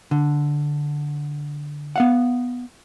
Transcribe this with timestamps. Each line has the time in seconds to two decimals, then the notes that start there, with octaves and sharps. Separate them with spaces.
0.11 D3
1.96 B3 F5 F#5